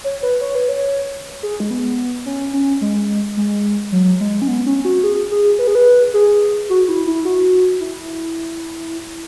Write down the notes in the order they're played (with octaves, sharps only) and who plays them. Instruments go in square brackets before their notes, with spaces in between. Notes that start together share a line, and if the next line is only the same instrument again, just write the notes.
[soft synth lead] C#5
B4
C#5
B4
C#5
G#4
G#3
B3
C#4
C#4
G#3
G#3
F#3
G#3
C#4
B3
C#4
F#4
G#4
G#4
B4
G#4
B4
G#4
F#4
E4
E4
F#4
E4